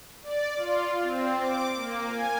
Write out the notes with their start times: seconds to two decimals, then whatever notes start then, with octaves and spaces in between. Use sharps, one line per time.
0.23 D5
0.56 F4
1.02 C4
1.37 D6
1.75 A#3
2.08 G#5